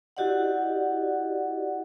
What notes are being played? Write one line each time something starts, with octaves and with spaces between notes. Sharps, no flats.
E4 F#4 G4 D5 D#5 F#5